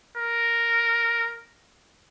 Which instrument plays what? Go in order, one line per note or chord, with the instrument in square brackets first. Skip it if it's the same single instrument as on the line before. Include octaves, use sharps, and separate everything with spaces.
[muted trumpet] A#4